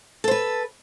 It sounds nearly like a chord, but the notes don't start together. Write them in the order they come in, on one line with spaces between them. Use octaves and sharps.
A4 C5 B4